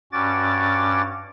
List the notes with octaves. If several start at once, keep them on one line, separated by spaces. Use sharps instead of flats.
G2 C#4 F#4 D6 A6